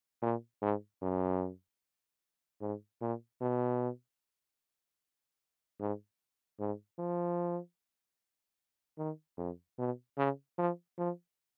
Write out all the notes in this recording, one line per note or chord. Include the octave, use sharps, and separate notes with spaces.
A#2
G#2
F#2
G#2
A#2
B2
G#2
G#2
F3
D#3
F2
B2
C#3
F3
F3